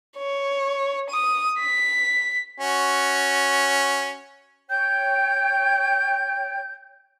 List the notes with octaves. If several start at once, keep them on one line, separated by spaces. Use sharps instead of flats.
C#5
D#6
B6
C#4 F#4
C#5 G5 G6